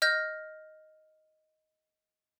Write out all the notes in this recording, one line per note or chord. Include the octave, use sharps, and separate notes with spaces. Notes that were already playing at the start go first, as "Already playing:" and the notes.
D#5 F6 G6 A#6